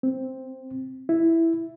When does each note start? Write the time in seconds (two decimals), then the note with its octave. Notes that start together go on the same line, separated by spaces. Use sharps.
0.03 C4
1.09 E4